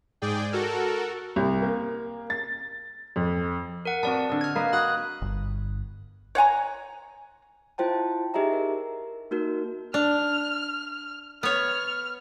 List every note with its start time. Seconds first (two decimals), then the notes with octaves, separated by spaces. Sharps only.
0.22 G#2 G#4 D5 G5
0.52 F#4 A4 A#4
1.36 C2
1.62 A#3
2.30 A6
3.16 F2
3.85 A#4 F#5
4.03 B3 C4 F#4 D5 A5
4.29 D3 D#5
4.41 F6 G#6
4.55 A#3 B4 D#5
4.73 F#4 B5 D#6 F#6
5.22 G1
6.35 C#5 F#5 G#5 A#5
7.78 E4 F4 C5 G5 A5
8.34 D#4 G4 G#4 D#5 E5 A#5
8.53 A#4
9.31 A#3 D#4 F#4 A#4
9.94 D4 F6
11.43 B3 C#5 F6